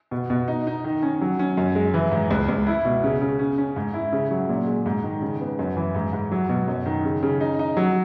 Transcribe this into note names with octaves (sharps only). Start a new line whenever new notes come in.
B2
B2
D#4
D#4
D#3
C#4
F#3
C#4
F#2
G#3
E3
G#2
C#2
C#2
E4
B2
C#3
C#3
C#4
C#4
G#2
E4
C#3
F#3
A#2
G#3
G#2
D#3
C#3
B3
F#2
E3
G#2
G#2
F#3
B2
F#2
D#3
C#3
C#3
D#4
D#4
F#3